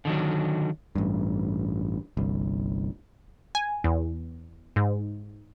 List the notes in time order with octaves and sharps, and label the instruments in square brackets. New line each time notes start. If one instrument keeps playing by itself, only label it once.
[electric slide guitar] D3 D#3 F#3
[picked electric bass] A1 G2
G1 C2
[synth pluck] G#5
E2
G#2